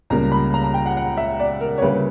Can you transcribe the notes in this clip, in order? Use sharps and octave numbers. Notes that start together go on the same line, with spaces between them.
C#2 C#3 G3 A#3 A#5
B5
A#5
A#5
G5
F#5
F#5
E5
D5
A#4
C#5
D2 C#3 G3 A#3 B4